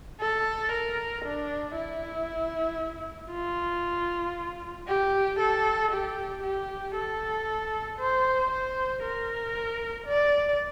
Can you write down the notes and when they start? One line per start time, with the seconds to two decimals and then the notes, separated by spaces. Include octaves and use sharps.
0.21 A4
0.72 A#4
1.25 D4
1.76 E4
3.31 F4
4.87 G4
5.39 A4
5.91 G4
6.43 G4
6.95 A4
7.99 C5
8.51 C5
9.02 A#4
10.06 D5